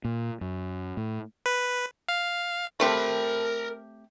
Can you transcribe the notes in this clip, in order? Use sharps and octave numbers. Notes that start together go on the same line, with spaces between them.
A#2
F#2
A2
B4
F5
A3 C4 G4 A#4 B5